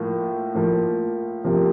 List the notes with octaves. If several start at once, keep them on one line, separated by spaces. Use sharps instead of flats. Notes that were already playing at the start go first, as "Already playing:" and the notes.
Already playing: A2 F3 A#3
A2 F3 A#3
C3 F3 A#3